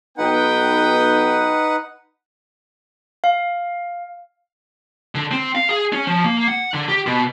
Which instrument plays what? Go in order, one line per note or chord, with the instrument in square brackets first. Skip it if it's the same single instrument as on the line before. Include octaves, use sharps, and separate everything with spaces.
[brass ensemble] B1 B3 G5 [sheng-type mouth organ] D#4 B4 F#5
[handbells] F5
[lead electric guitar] D3
C4
F5
G#4
C#4
F3
A#3
F#5
D3
G4
B2